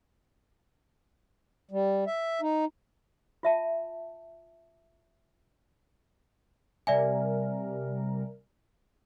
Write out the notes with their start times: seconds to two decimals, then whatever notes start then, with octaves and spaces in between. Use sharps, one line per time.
1.71 G3
2.07 E5
2.42 D#4
3.43 F4 E5 A5
6.87 C3 G3 A#4 D5 E5 G#5